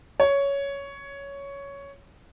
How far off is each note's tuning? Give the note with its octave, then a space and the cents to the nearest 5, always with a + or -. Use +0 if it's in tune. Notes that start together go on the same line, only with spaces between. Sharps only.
C#5 +10